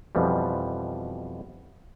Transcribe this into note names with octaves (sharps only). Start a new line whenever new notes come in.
F2 B2 E3 F3 G3